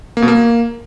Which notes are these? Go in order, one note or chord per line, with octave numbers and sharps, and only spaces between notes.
A#3
B2
A#3